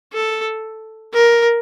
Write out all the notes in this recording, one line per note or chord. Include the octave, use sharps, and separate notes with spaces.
A4
A#4